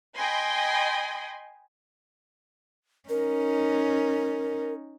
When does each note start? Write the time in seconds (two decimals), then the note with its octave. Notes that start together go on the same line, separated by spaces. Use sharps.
0.15 D#5 G5 G#5 B5 C6
3.09 C#4 D#4 A#4